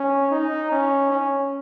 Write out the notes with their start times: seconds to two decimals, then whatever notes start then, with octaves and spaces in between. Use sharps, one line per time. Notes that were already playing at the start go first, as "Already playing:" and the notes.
Already playing: C#4
0.31 D#4
0.72 C#4
1.11 C#4